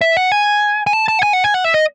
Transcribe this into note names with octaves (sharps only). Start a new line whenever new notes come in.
E5
F#5
G#5
G#5
A5
A5
F#5
G#5
F#5
G#5
F#5
E5
D#5